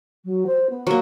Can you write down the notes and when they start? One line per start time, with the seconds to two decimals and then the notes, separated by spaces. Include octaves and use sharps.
0.24 F#3
0.46 C5
0.69 B3
0.87 F#3 A#3